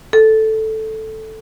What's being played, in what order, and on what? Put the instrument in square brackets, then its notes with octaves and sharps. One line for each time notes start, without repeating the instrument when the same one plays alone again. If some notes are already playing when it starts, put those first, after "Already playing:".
[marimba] A4